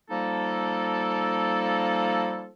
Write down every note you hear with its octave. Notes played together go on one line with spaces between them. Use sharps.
F3 G3 A#3 D#4 A4